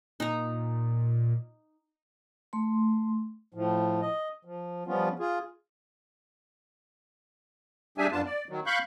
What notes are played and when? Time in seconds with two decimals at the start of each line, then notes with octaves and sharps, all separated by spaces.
0.20 A#2 D#4 A#5
2.53 A3 C6
3.54 A2 F3
4.02 D#5
4.45 F3
4.87 F3 G3 B3 C#4 F4
5.19 F4 G#4
7.98 G3 D4 G4 G#4 E5 G#5
8.12 F#2 B3 D4 F4 A5
8.25 D5
8.49 D#3 F#3
8.66 F5 B5 C#6 F#6 G6